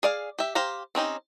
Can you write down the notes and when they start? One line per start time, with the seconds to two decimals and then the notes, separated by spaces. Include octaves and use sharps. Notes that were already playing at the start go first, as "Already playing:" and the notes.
0.03 G#4 D5 F5
0.39 G4 E5
0.55 G4 C5 F5 A#5
0.95 C4 C#4 D#4 G4